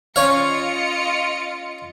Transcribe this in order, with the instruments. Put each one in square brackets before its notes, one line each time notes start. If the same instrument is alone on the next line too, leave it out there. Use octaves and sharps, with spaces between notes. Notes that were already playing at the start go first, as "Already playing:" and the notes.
[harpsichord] C#4 C#5 F5 [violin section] F4 D#5 C#7